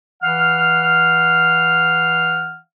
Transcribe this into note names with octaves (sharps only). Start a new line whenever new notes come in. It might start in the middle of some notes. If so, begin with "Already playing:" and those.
E3 F5 F#5 F6